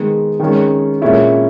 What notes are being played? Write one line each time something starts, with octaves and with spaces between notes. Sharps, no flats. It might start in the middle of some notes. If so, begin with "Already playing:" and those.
Already playing: D#3 G#3 B3
D#3 G#3 C#4
A#2 G#3 C#4 E4